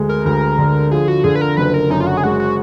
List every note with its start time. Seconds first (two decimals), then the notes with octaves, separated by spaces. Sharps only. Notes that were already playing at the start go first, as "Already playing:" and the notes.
Already playing: D2 G#3
0.09 A#4
0.26 D2 A#4
0.58 D3
0.91 F3 G#4
1.08 F#4
1.24 D3 G#4
1.36 B4
1.41 A#4
1.57 F#1 B4
1.74 A#4
1.90 F#2 D#4
2.00 F4
2.07 F#4
2.17 G#4
2.24 G#3 F#4
2.40 F#4